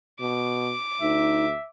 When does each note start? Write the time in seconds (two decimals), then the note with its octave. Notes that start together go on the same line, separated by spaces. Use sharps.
0.20 B2 D6
1.01 D2 D#4 E5